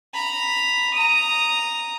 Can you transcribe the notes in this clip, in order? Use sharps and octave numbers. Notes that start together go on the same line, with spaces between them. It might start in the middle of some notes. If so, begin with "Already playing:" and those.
A#5 B5
A#5 D#6